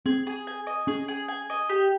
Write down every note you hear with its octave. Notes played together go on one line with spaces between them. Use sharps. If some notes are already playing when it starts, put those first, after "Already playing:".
C4 G#4
G#4
G#5
D#5
C#4 G#4
G#4
G#5
D#5
G4